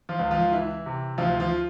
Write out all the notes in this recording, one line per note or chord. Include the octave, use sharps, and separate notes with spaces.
F3 F4
C#2
F3 F4
E3 E4
C3
D2 F3 F4
F3 F4